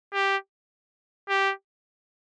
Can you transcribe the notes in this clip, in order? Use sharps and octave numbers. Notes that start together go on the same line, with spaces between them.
G4
G4